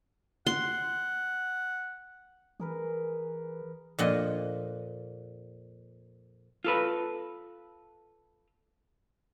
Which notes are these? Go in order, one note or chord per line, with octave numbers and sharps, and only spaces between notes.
F#5 C6
E3 G#4 A#4 B4
F2 A#2 D#5
F4 A4 B4